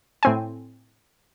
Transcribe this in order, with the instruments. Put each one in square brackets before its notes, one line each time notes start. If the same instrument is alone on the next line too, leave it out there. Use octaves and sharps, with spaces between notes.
[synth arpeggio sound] A2 C4 G#5